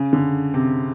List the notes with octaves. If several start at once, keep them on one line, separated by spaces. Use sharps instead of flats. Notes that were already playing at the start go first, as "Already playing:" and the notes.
Already playing: C#3
D3
C3